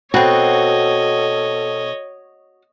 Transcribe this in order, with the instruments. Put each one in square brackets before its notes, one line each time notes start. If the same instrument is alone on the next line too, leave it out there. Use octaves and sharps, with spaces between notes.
[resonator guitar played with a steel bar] B2 C4 [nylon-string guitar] F#4 [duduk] A4 [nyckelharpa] C#5 D#5